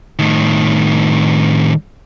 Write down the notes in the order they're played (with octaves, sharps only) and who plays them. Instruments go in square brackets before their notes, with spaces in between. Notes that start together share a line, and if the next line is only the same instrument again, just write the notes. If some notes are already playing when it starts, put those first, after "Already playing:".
[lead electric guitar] A2 D#3